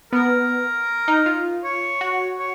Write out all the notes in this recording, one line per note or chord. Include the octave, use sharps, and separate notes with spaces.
B3 A#4
D#4
F4
C#5
F#4
C#5